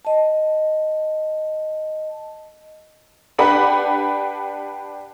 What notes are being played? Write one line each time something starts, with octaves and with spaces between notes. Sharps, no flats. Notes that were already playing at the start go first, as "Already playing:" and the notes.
D#5 A5
D4 G4 B4 F#5 B5